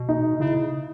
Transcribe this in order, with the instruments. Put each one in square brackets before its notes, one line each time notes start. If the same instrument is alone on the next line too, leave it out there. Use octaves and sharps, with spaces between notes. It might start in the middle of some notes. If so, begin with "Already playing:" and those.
Already playing: [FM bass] B2
[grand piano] D#4
[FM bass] C#3 [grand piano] E4